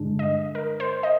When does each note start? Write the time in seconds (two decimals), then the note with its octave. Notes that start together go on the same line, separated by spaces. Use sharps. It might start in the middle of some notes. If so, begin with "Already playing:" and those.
Already playing: G2 D3 G#3 D4
0.19 D#5
0.55 A#4
0.80 C5
1.03 D#5